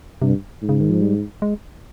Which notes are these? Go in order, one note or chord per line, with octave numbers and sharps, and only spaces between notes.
G2 C3
G#2
C#3
D#3
F3
G3
G#3